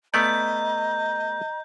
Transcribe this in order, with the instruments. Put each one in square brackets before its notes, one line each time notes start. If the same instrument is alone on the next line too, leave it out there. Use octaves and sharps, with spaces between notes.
[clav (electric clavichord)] A3 B3 D5 [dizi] D#5 [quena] A#5 [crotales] G6